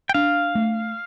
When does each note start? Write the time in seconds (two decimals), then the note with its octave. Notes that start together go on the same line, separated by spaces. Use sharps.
0.09 G5
0.14 D4 F5
0.55 A3